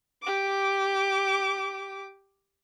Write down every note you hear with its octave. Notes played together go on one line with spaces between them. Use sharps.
G4 D6